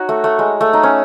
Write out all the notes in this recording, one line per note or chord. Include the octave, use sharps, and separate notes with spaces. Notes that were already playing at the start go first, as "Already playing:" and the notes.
Already playing: D#4 F#4 C#5
A3
A3
G#3
A3
D#4
C#4